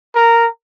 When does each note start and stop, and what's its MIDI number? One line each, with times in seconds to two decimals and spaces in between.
0.15 0.46 70